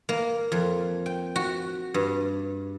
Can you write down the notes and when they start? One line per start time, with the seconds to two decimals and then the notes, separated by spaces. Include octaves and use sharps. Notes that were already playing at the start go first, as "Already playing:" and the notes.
0.09 A#3
0.52 F2
1.06 G5
1.36 F#4
1.94 G2